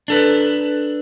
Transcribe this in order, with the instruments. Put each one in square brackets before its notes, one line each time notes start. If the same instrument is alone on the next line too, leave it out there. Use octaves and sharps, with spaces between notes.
[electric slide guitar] D4 A4 B4